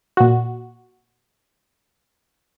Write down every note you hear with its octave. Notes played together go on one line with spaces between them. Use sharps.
A#2 F#4